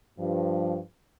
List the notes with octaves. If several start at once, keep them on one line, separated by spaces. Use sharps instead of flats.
G2 F3